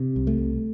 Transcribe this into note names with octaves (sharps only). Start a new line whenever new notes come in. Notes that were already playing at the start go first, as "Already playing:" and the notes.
Already playing: C3
C2
A3
C2